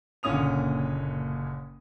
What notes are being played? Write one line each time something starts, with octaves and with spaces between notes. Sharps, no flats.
F#1 A#2 D3 C#4 D#6 F7